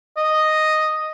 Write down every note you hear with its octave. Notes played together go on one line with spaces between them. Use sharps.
D#5